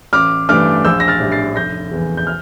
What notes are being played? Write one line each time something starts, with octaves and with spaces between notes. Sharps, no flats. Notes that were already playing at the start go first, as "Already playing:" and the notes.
A1 D6 F6
G2 E3 A3 D4 D6 F6
A#1 E6 G6
A#6
F6 A6
A2 G3 D4
A6 C7
F1 G6 A#6
E2 E3
G6
F6